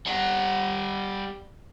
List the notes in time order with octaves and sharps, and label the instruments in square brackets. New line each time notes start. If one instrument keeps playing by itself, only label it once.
[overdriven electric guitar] G3 F#5